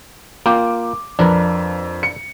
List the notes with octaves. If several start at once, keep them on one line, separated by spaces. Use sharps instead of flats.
A#3 F4 G5 D6
F2 D4 A#4 B4
C#7